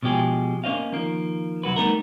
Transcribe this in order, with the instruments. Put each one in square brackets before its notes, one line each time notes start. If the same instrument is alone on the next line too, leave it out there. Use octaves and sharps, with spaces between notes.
[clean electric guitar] B2 F3 G#3 G4 G#4
A#3 C#4 C5 D#5 F5
D#3 F3 A#3
C2 F#3 F#4 B4
G3 A3 B3 D#4 A#4